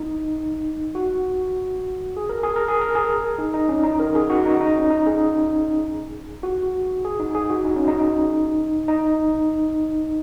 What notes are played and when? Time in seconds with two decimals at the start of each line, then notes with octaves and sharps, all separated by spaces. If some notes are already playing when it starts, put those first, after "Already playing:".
Already playing: D#4
0.95 F#4
2.17 G#4
2.29 A#4
2.43 G#4
2.56 A#4
2.68 G#4
2.81 A#4
2.95 G#4
3.38 D#4
3.54 D#4
3.69 C#4
3.84 D#4
4.00 A#4
4.15 G#4
4.30 F#4
4.46 D#4
4.61 D#4
4.76 C#4
4.91 D#4
5.07 G#4
6.43 F#4
7.05 G#4
7.20 D#4
7.35 G#4
7.50 F#4
7.65 D#4
7.76 C#4
7.88 D#4
8.88 D#4